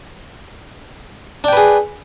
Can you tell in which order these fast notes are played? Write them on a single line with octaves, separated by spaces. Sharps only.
D4 G5 B4 G#4